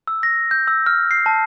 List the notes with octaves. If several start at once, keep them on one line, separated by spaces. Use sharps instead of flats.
E6
A#6
G6
E6
F6
C7
A5